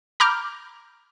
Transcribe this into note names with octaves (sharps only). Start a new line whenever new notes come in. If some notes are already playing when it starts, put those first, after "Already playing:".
A#5 B5 D6 F6 G6